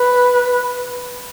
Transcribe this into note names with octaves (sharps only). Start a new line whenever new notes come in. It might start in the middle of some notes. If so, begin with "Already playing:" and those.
Already playing: B4